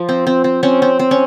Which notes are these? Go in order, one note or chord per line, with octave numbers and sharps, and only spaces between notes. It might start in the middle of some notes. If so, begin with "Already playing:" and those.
Already playing: F3
C4
C4
C4
C4 C#4
C4
C4
C#4